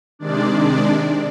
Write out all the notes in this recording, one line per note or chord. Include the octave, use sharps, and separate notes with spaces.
C3 D#3 G#3 D4 D5
D4 D5